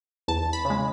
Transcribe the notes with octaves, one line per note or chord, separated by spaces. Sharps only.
E2 A5
B5
C#3
G#3